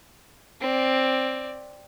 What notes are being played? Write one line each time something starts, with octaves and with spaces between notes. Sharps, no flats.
C4 D5